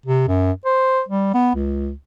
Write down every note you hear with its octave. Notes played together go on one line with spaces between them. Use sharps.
C3
F#2
C5
G3
B3
C#2